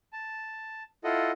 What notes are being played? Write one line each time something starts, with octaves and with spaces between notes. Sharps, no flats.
A5
E4 F4 A4 D#5 F#5